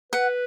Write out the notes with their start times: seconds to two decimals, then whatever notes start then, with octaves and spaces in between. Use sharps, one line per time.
0.12 B4 F#5